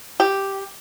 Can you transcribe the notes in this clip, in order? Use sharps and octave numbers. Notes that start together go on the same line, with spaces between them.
G4